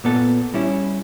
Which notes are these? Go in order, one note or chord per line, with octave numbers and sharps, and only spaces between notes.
A#2 B3 A4
G3 C#4 E4